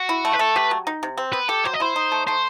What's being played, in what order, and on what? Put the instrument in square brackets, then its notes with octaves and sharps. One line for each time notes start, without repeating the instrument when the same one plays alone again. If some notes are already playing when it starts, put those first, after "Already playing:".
Already playing: [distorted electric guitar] F#4
[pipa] E4
A3
[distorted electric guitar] B4
[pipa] A3 [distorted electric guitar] A4
[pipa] G4 [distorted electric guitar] B4
[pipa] F#3
D#4
C3
C4
[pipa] B3 [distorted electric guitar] B4
[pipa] G4 [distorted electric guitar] A4
[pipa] F#3 [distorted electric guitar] C5
[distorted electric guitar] D#5
[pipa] E4 [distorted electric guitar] C5
[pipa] D#4
A3
[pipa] A3 [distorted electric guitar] C5